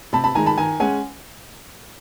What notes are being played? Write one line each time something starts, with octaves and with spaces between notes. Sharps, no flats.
C3 A5 B5
A5 B5
D#3 G#3 G#5 A#5
A5 B5
D#3 G#5 A#5
G#3 C#4 F#5 G#5